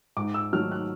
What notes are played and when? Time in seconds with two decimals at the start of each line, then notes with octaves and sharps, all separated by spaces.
0.17 G#2 D6
0.34 E6
0.53 D#3 F#3 A3 F6
0.71 F#6